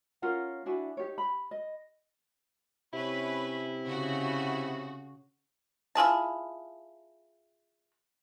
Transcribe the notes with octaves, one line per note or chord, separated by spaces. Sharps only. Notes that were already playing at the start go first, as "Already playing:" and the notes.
C#4 F4 A#4 F#5
D4 E4 F#4 G#5
D#4 G4 C#5
B5
D#5
C3 C#4 E4 B4
C#3 F#4
E4 F4 G#4 A5